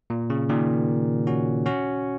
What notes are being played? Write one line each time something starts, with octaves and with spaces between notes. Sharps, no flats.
A#2
C#3
A#2 D#3
C#4 F#4
C#4 F#4